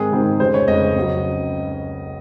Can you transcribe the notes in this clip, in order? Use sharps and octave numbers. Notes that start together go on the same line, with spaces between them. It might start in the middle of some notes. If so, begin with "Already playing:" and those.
Already playing: G#2 D#3 G#3 C4 G#4
G#2 D#3 G#3 C4
F1 F2 C#3 G#3 C5
C#5
F1 F2 C#3 G#3 D#5
C#2 C#3 F#3